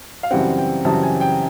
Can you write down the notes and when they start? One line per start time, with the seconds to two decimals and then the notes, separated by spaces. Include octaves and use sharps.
0.23 F5
0.31 F#2 C#3 E3 G3 C4 F#5
0.58 G5
0.85 F#2 C#3 E3 G3 C4 A5
1.03 G#5
1.21 G5